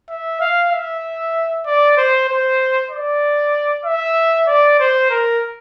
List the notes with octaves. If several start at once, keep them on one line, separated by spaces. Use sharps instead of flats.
E5
F5
E5
D5
C5
C5
D5
E5
D5
C5
A#4